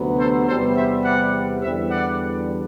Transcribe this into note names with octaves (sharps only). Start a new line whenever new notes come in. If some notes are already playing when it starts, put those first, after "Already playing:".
Already playing: D2 C3 F#3 B3
A4 C5
E2 C3 G3 B3 A4 C5
C5 E5
D5 F#5
E2 D3 G3 C5 E5
D5 F#5